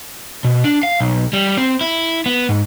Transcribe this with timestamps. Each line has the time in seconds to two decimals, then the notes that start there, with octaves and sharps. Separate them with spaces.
0.44 B2
0.64 D4
0.83 F5
1.00 B1
1.33 G3
1.58 C4
1.81 E4
2.26 B3
2.49 G#2